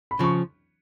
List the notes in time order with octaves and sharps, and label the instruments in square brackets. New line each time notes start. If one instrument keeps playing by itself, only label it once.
[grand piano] B5
[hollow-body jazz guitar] C#3 F3 [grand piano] C#6